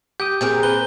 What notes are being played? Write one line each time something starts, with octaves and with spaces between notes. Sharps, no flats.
G4 G5 D#6 G6
A#2 C4 G#4 A#4 G6
B4 G7